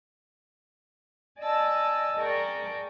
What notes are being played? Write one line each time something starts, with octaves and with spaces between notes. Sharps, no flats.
D5 D#5 G#5 A5 E6
G#4 A#4 D5 G5 A5 C#6